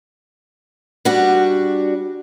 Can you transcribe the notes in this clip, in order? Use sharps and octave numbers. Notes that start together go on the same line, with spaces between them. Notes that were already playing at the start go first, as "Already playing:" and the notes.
G3 D4 F#4